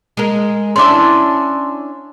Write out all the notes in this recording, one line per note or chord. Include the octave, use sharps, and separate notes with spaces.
G#3 A#4
C#4 D4 E4 C6 D6